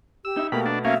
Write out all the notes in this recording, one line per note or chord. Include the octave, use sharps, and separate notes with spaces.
G4 E6
D#4 E5
B2 A3 A#3 G4 A#4 B5
B3 D4
F#3 A#3 C#4 E5 F5